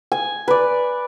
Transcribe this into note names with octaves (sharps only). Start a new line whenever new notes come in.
G#5
B4 D5